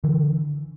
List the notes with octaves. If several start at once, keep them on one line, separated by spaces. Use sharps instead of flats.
D3 E3